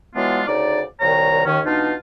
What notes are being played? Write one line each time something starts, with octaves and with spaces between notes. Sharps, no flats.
E3 F#3 G#3 B3 D4 F4
D2 C#3 D#4 D5
C2 A#2 D#3 C#5 A#5
D#2 D#3 C#4
B2 E3 D4 D#4 F4